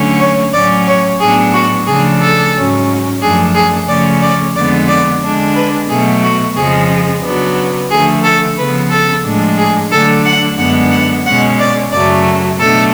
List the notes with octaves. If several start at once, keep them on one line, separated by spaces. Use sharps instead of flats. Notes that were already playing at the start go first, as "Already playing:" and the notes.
Already playing: D3 F#3 A3 C#4
C#5
A2 F#3 C#4 D5
C#5
A2 F#3 B3 D4 G#4
F#4
C#3 F3 A3 D4 G#4
A4
G#2 F#3 C#4
F#2 F3 A3 D4 G#4
G#4
C#3 F3 A3 C#4 D5
D5
F2 D3 G#3 B3 D5
D5
D3 G#3 D4
B4
B2 F#3 A3 G#4
F#4
F2 C#3 F3 G#3 G#4
C#3 F#3 B3 D4
D3 F3 A3 G#4
A4
C#3 F3 B3 B4
A4
A2 F3 G#3 D4
G#4
D3 F#3 A3 D4 A4
F#5
F#2 D3 G#3 B3 D4 F#5
F#5
B2 G#3 C#4 F#5
D5
F#2 C#3 F#3 A3 D5
B2 F#3 A3 D4 A4